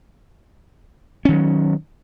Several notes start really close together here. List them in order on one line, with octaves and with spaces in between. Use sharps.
C#4 D#3 F#3